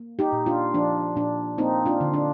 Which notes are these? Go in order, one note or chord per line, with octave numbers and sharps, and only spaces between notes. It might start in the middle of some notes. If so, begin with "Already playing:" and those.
Already playing: A#3
D#4 G4
A#2
D4 F4
F3 D4
A#2 D4
A#3 C4 D#4
D4 F4
D3
D4